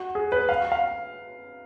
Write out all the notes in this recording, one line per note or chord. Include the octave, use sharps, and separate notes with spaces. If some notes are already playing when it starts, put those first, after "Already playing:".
Already playing: F#4
G#4
B4
F5
F5